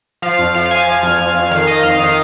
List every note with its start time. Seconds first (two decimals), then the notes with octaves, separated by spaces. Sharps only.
0.22 F3 F5
0.39 F2
0.54 F3 F5
0.66 F5
0.71 F3 G#5
0.87 F3
1.03 F2
1.20 F2
1.35 F2
1.51 D#3 F5
1.67 D#3 D#5
1.83 F2 F5
2.00 D#3 F5